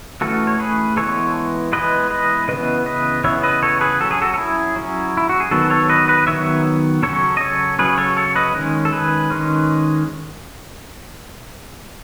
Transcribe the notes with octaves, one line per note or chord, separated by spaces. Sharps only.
E3 A3 C#4 F#4 A4
C#5
G#4 B4
E3 G#3 B3 A4 C#5
E3 G#3 B3 B4 D#5
B4 D#5
C#3 E3 B3 B4 D#5
B4 D#5
C#3 E3 B3 C#5 E5
B4 D#5
A4 C#5
G#4 B4
F#3 C#4 A4
G#4
F#4 A4
A4
E4 G#4
F#3 C#4
E4
F#4
G#4
D#3 F#3 B3 F#4 A4
A4 C#5
B4 D#5
B4 D#5
D#3 F#3 B3 C#5 E5
C#3 F#3 C#4 A4 C#5
D#5
A4 C#5
C#3 F#3 C#4 G#4 B4
A4 C#5
A4 C#5
B4 D#5
D#3 G#3 C#4
A4
G#4 B4
D#3 G#3 C#4